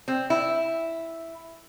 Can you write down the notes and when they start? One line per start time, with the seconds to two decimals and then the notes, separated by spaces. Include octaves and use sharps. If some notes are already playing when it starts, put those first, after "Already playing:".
0.08 C4
0.30 E4